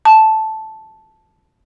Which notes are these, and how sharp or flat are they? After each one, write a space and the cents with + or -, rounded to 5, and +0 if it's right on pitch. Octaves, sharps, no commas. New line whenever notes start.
A5 -5